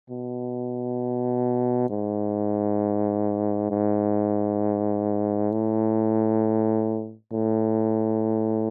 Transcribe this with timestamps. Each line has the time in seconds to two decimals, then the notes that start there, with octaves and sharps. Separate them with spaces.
0.10 B2
1.90 G#2
3.71 G#2
5.51 A2
7.32 A2